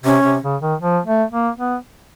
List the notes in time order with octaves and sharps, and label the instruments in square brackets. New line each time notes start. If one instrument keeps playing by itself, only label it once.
[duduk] C3 [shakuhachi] C#4
[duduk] C3
C#3
D#3
F3
A3
A#3
B3